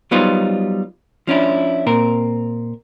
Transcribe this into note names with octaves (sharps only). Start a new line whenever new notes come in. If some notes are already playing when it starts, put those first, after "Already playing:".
F#3 G3 B3 D#4 F4 C5
F3 C#4 D4 E4
A#2 C4 A#4